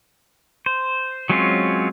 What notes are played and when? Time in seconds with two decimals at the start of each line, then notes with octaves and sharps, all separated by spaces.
0.66 C5
1.30 F#3 G#3 C4 C#4 F4